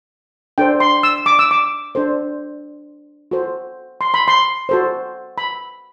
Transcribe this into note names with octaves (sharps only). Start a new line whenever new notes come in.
D4 A4 C5 G5
C6
E6
D6
E6
D6
D4 A4 C5
F#4 A4 C5
C6
B5
C6
F#4 A4 C5
B5